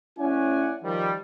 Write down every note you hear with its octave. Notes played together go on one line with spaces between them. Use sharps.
A3 C#4 E4 D5 F#5 G#5
D#3 F3 G3